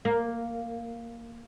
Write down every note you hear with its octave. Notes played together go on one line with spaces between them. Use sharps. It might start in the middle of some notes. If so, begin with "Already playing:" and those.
A#3